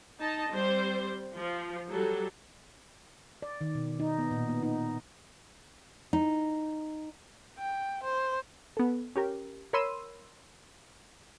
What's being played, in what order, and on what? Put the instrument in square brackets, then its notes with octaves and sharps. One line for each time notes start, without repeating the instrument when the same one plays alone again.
[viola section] D#4 D#5 A5
G3 C4 C5
F3
F#3 G3 A4
[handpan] D5
D#3
B2
D#4
B3
A#2
B3
D#4
[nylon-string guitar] D#4
[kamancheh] G5
C5
[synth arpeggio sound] B3 A4
C#4 G4 A#4
A#4 C#5 B5 C6 E6 D#7